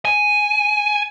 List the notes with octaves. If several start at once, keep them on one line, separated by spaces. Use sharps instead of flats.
G#5